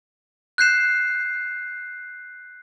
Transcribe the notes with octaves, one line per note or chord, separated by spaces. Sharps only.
F#6 G6 C7 E7